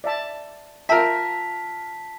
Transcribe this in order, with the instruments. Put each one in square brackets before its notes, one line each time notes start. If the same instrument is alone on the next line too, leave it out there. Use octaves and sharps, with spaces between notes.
[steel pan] D5 E5 A5
[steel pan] F4 G5 [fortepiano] A#4 E5 [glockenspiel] A5 B6